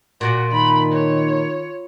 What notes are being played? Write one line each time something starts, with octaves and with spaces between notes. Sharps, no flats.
A#2 F#4
D#3 B5
C#5